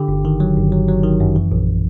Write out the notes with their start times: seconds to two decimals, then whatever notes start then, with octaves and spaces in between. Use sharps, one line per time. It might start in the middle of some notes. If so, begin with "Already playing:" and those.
Already playing: D3 G4
0.08 G1
0.25 D#3
0.40 F#3
0.57 G1
0.72 F#3
0.88 F#3
1.03 D#3
1.20 F#2
1.36 E3
1.52 A#1